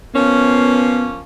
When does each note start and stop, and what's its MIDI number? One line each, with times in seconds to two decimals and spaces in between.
0.14 1.20 53
0.14 1.20 58
0.14 1.07 59
0.14 1.20 61